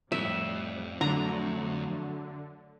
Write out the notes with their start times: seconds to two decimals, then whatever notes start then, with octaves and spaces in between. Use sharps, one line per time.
0.12 F2 A2 G3 E5
1.01 D3 F#3 A3 A#5